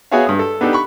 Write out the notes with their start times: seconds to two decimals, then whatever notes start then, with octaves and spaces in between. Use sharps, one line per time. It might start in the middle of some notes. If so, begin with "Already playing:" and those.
0.11 B3 F#4 G#4 C#5 E5 F5
0.26 G2 D#6
0.39 A4
0.61 B3 D4 D#4 G4 A4
0.73 B5 C#6